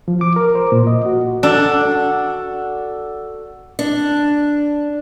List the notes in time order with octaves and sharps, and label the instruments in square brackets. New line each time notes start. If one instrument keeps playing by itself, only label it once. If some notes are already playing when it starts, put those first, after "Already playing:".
[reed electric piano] F3
D6
A#4
C5
A#2
D#5
F#4
[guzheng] D4 [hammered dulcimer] F#4 A4 F#5
[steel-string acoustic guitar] D4